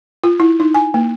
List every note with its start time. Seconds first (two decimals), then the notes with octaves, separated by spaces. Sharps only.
0.24 F4
0.40 E4
0.60 D#4
0.74 G#5
0.94 A#3